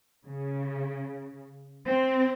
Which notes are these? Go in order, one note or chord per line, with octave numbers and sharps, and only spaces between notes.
C#3
C4